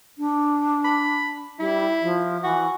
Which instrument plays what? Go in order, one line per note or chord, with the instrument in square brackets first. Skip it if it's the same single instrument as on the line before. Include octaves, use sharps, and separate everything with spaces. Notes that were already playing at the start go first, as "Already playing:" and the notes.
[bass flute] D4
[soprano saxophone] B5
[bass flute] G3 [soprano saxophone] E4
[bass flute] F3
[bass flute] E3 [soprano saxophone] F#4